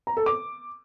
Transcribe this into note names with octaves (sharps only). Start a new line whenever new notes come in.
A#5
A4
D6